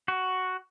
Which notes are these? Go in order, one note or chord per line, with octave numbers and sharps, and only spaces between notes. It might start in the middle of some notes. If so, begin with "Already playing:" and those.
F#4